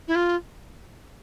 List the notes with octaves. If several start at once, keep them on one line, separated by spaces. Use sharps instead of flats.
E4
F4